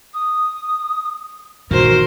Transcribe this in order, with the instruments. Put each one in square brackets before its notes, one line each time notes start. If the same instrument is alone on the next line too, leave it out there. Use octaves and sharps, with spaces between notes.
[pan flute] D#6
[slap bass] E1 D#3 [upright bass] A#2 [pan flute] F#4 [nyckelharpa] A#4 C5